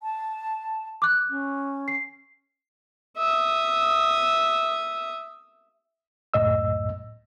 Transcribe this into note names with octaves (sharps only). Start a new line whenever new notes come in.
A5
D6 F#6
C#4
C7
E5 D#6
C#2 F#2 A2 D#5 E6